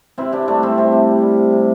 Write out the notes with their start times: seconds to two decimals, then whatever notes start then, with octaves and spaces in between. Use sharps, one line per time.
0.18 C3 C4 E4
0.32 C3 D4 G4
0.47 G3 A3 D4
0.63 G3 C4 E4
0.78 C3 C4
0.92 C3
1.08 G3
1.22 G3
1.38 C3
1.53 C3